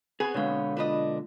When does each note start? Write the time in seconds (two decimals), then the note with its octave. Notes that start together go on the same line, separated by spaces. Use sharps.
0.20 B3 C4 G#4 B4 G#5
0.34 B2 D3 G#3 C#5 F5
0.77 D4 F4 B4 D#5